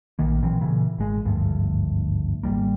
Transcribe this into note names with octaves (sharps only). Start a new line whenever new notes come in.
A#1 D#3 A#3
A#2 E3 F#3 C4
A#2 C#3 E3
G#1 G#3
G#1 D2 G2 F3
G#1 E2 G3 A#3